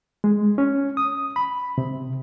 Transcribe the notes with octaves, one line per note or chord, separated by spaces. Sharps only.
G#3
C#4
D#6
B5
C3